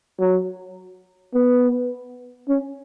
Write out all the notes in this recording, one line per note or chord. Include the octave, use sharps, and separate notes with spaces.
F#3
B3
C#4